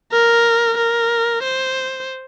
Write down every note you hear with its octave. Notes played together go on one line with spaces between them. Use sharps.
A#4
A#4
C5